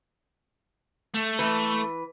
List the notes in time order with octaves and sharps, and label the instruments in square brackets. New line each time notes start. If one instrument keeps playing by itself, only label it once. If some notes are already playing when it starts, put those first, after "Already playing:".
[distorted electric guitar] A3
[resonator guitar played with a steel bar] E3 B4